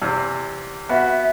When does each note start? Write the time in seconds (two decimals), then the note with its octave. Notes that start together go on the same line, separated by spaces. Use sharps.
0.02 E2 C3
0.89 B3 F#4 E5